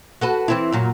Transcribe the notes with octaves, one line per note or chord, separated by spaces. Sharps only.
F#4 A4 B4
E3 C4 E4
F#2 A#2 F#3